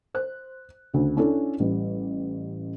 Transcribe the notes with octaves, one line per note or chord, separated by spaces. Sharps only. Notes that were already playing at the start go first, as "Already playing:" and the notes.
C5 F#6
D2 C#3
C#4 D4 E4 A4
A1 G3